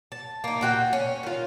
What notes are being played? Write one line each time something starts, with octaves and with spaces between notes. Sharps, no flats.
A5
A#3 D#4
A#2 F#4 G5
C#4
D#3 F4